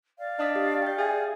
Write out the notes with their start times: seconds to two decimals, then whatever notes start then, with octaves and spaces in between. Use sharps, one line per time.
0.19 D5 F5
0.39 D4 D#5 D#6 B6
0.56 G4
0.82 G5 G6
0.98 G#4 E5